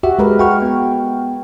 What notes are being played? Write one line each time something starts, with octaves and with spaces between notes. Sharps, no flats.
F#4 G4 E5
G#3 A#4 B4
F#4 G5 C#6 F6
B3 G5